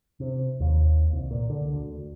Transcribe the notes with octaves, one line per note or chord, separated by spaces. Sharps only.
C3
D#2
C2
A#2
D3
D2